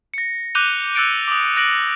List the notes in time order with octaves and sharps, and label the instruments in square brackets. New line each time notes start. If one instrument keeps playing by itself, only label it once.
[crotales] A#6 C#7
D6 F#6 G6 D#7 F7 G7
E6 F#6 A6 C#7 D7
D6 D#6
F#6 A#6 D7 F#7